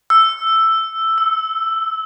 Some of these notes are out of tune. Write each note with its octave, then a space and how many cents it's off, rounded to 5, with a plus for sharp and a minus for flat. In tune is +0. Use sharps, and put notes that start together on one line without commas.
E6 +5
E6 -20